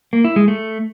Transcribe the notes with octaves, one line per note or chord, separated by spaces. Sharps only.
A#3
E4
G#3
A3